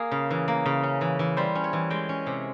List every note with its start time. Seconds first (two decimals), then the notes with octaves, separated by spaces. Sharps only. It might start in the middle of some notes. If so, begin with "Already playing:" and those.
Already playing: A#3 G#4 A#4
0.11 C#3
0.30 E3
0.48 A#3
0.66 C#3
0.83 C#4
1.01 E3
1.19 E3
1.37 G3 C5
1.55 C#4
1.64 C#5
1.73 E3
1.90 G#3 G5
2.09 C#4
2.26 C3